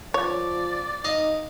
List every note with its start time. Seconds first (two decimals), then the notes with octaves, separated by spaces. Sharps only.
0.14 F3 C#5 D5
1.04 D#4 D#5 F5